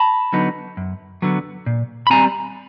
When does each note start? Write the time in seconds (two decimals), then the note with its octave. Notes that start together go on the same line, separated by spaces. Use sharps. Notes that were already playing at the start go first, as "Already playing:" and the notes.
Already playing: A5 B5
0.33 D3 F#3 B3 D#4
0.77 F#2
1.22 D3 F#3 B3
1.66 A#2
2.07 B5
2.10 G3 C4 G#5 A#5